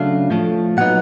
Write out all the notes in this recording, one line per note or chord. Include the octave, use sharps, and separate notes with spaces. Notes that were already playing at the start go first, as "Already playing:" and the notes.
Already playing: C#3 F#3 A3 D4 F5
A2 F3 A3
A#2 F#3 B3 D#4 F#5